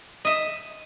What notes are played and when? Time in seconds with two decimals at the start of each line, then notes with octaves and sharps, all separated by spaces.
0.25 D#5 E5